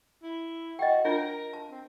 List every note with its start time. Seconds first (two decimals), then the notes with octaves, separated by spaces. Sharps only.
0.23 E4
0.79 F#4 D#5 G5
1.05 D4 F4 A#4 C#5
1.53 A5
1.71 C4